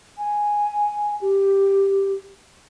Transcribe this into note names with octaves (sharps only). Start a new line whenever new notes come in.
G#5
G4